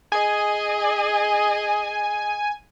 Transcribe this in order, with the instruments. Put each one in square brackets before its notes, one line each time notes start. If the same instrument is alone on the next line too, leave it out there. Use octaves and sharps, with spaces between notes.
[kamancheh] G#4 D#5 [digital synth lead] G#5